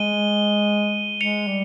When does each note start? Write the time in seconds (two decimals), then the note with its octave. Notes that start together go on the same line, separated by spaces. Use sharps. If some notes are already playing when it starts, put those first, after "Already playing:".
Already playing: G#3 D#7 G7
1.21 G#3 C#7 F7
1.47 G3